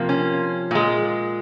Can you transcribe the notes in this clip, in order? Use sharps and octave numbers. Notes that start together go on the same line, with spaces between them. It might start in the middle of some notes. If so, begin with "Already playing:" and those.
Already playing: C3 F3 A#3
C#4
A#2 G#3